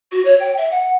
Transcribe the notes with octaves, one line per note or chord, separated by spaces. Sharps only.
F#4
C#5
G5
E5
F#5